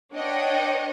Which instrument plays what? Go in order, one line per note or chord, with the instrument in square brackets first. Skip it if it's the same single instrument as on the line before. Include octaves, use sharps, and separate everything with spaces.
[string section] D4 B4 C#5 D#5 F#5 G5